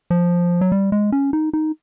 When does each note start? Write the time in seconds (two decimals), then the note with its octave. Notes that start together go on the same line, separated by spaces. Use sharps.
0.10 F3
0.61 F#3
0.72 G3
0.92 G#3
1.12 C#4
1.33 D#4
1.53 D#4